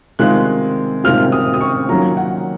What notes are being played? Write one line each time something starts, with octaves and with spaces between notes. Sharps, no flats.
C3 D#3 G#3 C4 F4 F#6
C3 D#3 G#3 C4 F4 F6
D#6
D#6
C#6
D#3 F#3 A#3 C#4 F4 A#5
F#5